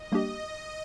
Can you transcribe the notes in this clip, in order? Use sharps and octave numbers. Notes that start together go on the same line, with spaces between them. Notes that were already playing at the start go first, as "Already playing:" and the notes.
Already playing: D#5
G3 A#3 D4 G4